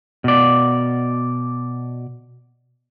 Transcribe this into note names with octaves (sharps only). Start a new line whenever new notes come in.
B2 D5